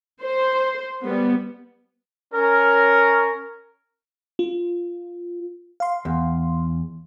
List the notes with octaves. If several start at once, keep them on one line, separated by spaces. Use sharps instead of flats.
C5
G3 B3
C#4 A#4
F4
F5 C6
E2